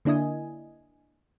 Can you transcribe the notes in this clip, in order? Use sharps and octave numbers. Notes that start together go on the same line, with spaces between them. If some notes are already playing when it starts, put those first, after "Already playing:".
D3 A#3 D4 E4 D#5 G#5